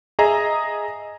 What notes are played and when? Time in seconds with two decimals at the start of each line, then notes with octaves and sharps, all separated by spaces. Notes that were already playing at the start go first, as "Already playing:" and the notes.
0.19 G#4 D#5 E5 A#5